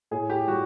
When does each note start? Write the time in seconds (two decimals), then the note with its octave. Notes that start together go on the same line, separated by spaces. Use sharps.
0.11 A2 G#4
0.30 G4
0.48 G3 F#4